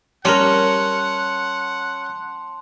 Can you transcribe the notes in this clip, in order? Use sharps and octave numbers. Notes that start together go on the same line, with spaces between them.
G3 C#4 A#4 F#5 A5 C6 F7